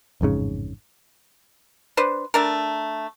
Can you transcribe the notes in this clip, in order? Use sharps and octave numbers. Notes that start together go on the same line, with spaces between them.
A1 F2 G#2 C#3
D4 B4 C5
A3 D4 A#4